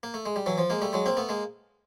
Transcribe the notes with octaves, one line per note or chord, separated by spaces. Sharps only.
A#3
A3
G#3
G3
E3 F#3
F3
G#3 A#3
G3 A3
F#3 G#3
A#3 C4
A3 B3
G#3 A#3